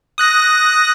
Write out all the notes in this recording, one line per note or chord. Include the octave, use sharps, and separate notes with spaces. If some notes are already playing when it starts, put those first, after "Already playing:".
D#6 F#6 A#6